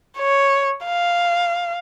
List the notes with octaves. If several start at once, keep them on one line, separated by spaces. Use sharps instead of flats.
C#5
F5